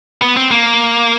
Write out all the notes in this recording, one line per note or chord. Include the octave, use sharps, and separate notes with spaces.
B3
C4
A#3